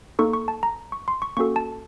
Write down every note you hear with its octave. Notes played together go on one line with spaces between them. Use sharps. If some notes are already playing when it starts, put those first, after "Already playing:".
A#3 D#4 A4 C#6
C#6
A5
A#5
C#6
C6
C#6
A#3 C#4 F#4 A4 C#6
A5